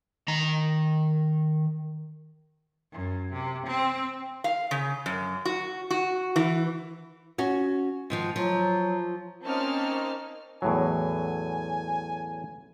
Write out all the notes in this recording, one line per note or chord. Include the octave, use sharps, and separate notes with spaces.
D#3 A#5
F#2
C3
C4
F5
C#3
F#2
F#4
F#4
E3
C#4 F#4
G#2 D#3 F3
F3 F#3
A#3 C4 C#4 D#4 A5 F6
E2 A2 F#3 G#5